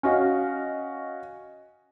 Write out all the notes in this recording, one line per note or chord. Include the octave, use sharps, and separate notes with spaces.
C#4 F#4 D#5 F5